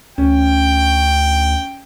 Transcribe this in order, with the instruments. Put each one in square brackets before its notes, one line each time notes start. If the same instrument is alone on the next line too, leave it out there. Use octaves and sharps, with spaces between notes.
[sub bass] D2 [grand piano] C#4 [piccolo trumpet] G5